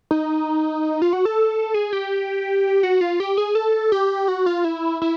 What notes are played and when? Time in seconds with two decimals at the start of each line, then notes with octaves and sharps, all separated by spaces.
0.11 D#4
1.02 F4
1.13 F#4
1.25 A4
1.74 G#4
1.93 G4
2.83 F#4
3.01 F4
3.20 G4
3.38 G#4
3.55 A4
3.92 G4
4.28 F#4
4.46 F4
4.65 E4
5.02 E4